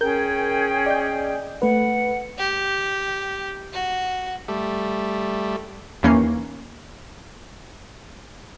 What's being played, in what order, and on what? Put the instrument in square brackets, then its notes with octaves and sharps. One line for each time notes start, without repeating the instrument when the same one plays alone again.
[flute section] C#4 G#4 G5 [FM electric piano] A#4 G6
[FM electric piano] D5 D#5 G6
[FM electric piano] A3 B4 [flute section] F#5
[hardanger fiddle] G4
F#4
[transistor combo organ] G3 A3
[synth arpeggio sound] D#2 E3 A#3 C#4 C7